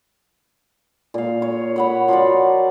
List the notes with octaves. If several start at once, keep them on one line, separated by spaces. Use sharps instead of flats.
A#2 F5
C#5
C#5 F#5 B5
F3 F#3 A#4 D5